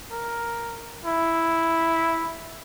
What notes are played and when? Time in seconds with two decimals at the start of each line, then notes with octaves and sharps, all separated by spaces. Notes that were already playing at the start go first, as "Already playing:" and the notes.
0.11 A#4
1.05 E4